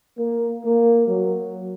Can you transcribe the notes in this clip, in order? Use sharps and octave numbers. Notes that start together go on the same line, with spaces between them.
A#3
A#3
F#3